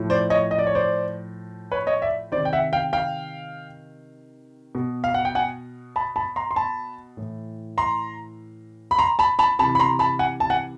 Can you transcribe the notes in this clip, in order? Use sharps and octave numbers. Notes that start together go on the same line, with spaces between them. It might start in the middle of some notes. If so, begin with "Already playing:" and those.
Already playing: A2 F3
C5 D5
C#5 D#5
D#5
D5
C#5
C5 D5
B4 C#5
C#5 D#5
D5 E5
C3 D#3 C5 D5
G5
E5 F#5
F5 G5
F5 G5
B2
F5
F#5
G5
F#5 G#5
A5 B5
A5 B5
A#5 C6
C6
A5 B5
A2 E3
A#5 C6
B5
A#5 C6
A5 B5
A5 B5
C3 E3 A5 B5
B5
A#5 C6
A5 B5
F#5 G#5
A5
F#5 G#5